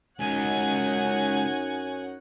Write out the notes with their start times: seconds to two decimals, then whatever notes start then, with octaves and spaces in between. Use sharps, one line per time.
0.19 C#2 F#2 D#4 C#5 D#5 F#5 G#5